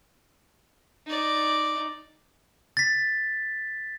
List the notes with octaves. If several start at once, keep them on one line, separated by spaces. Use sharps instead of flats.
D#4 D5
A6 B6